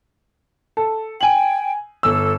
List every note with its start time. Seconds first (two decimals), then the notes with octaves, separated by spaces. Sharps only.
0.77 A4
1.21 G5 G#5 F#7
2.03 G1 A4 E6